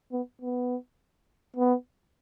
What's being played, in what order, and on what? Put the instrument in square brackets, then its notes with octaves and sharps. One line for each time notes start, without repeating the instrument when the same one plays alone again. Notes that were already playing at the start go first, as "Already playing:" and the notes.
[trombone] B3
B3
B3